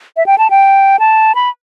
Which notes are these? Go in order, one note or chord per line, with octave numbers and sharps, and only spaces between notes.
E5
G5
A5
G5
A5
B5